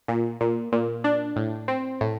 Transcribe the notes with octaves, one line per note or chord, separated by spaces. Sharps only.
A#2
A#2
A#2
D4
A2
C4
A2